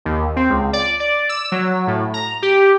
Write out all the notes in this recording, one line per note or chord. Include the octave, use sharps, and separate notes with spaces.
D#2
C4
C#2
D5
D5
E6
F#3
A2
A#5
G4